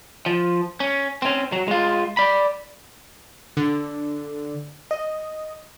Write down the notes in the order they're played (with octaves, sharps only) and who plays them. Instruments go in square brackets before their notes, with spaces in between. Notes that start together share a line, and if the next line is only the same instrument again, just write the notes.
[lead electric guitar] F3
C#4
C4 C#4
F#3
G#3 F4
D5 B5
[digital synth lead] D3
D#5